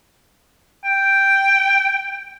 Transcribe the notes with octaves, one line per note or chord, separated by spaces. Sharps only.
G5